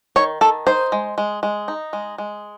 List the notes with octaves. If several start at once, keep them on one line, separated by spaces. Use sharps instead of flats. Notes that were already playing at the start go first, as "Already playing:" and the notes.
D#3 C#5
D#3 A4
D#4 C5
G#3
G#3
G#3
D#4
G#3
G#3